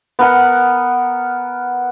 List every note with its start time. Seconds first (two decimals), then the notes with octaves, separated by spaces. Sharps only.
0.19 B3 A#4 F#5